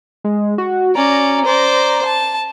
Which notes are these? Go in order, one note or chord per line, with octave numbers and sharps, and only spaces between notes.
G#3
F#4
C#4 D5 A#5
C5 D5
A5